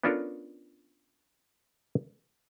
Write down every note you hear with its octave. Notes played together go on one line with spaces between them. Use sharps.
B3 C#4 D4 F4 A4 A#4